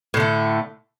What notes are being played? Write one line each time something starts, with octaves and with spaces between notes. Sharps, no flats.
A2 D3 A3